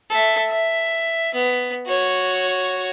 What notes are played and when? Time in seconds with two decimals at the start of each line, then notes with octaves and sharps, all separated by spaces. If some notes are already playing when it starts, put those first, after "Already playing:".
0.10 A4 E5
0.50 E5
1.34 B3
1.87 F#4 C#5